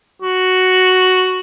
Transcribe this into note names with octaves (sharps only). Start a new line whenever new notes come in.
F#4